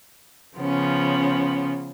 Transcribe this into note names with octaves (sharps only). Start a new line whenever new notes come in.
C#3 F3 B3 C#4